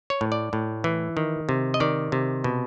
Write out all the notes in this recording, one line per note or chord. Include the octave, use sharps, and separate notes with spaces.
C#5
A2
D5
A2
E3
D#3
C3
D#5
D#3 D5
C3
B2